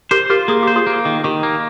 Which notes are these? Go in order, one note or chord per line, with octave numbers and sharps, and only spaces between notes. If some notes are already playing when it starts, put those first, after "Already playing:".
G4 A#4 C5
F4 G4 A#4
A#3 G#4
G4 C5
F4 G#4
A#3
D#3
D#3 G4
A#3